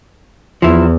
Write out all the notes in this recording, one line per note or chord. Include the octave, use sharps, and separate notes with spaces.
E2 F3 E4